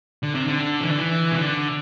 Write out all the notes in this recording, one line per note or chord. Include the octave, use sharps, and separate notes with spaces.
D3
C3
D3
E3
D3
E3
C3
D3